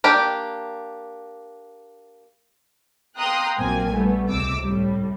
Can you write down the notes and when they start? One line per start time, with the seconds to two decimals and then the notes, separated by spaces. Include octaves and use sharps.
0.04 A#3 D4 G4 G5
3.16 F5 G5 A#5 C6 D#6 F#6
3.58 A#1 A#2 F#3 A#3 C4 G#5
3.91 G3 A3 B3
4.27 C#2 C3 D6 E6
4.61 A2 G3